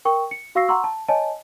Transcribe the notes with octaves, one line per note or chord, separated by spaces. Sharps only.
A#4 G5 C#6
C#7
F#4 F5 C#6 E6 A#6 C7
F#5 A#5 C6 C#6 E6
A5
C#5 D#5 G#5 A5